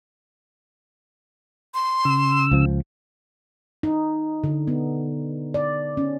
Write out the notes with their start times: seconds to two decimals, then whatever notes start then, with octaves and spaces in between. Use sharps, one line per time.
1.74 C6
2.05 C#3 E6
2.51 C#2 F3
3.83 D#4
4.44 D3
4.67 B3
5.54 D5
5.97 C#4